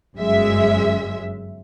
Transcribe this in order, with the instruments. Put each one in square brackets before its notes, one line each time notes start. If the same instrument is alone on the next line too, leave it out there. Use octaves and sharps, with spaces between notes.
[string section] G1 F#2 G#3 E5